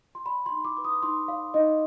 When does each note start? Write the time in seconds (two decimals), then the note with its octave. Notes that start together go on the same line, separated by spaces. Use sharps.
0.15 C6
0.26 D5 B5
0.46 C6
0.52 D#4
0.64 D6
0.77 B4 D6
0.84 D#6
1.03 D#4 C6
1.28 D5 F5
1.54 D#4 D#5